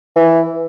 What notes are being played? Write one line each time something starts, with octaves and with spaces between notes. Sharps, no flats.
E3